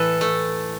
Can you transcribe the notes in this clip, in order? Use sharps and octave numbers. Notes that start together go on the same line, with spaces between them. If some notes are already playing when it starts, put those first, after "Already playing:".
Already playing: A2 E3 A4 B4
A3